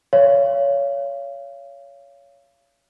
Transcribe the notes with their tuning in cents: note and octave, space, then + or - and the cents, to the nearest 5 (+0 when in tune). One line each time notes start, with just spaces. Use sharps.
C#5 +20 F5 -30